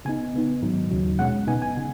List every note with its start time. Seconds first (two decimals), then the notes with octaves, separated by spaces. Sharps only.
0.05 C#3 B3 D#4 G#5
0.34 C#3 B3 D#4
0.62 G#2 D#3 F#3 D#4
0.91 D#2 C#3 F#3
1.19 B2 G#3 C#4 F#5
1.47 B2 B3 D#4 G#5
1.62 G#5
1.77 C#3